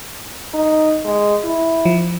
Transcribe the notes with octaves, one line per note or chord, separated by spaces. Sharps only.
D#4
G#3
E4
F3